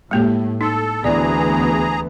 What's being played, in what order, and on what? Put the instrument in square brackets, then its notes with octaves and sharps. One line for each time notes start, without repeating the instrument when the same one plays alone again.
[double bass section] A2 [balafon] G#3 A#3 G4
[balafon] D#4 [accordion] A4
[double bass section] D2 E3 B3 [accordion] G#4 A#5 [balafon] D5